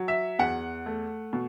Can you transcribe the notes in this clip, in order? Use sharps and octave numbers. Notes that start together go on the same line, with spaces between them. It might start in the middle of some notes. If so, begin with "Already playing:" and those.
Already playing: F#3
E5
E2 F#5
A3
B2